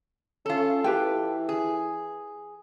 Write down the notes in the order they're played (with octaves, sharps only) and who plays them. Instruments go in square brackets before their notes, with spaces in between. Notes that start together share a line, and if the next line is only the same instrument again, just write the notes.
[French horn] C#4 [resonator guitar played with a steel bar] F4 A4
[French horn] E3 [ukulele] G4 B4 G5
[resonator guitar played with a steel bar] G#4